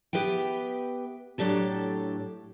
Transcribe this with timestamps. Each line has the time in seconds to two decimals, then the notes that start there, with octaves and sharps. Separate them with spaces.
0.13 B3 G4 B4 E5 G5
1.38 A2 F#3 D4 G4 A4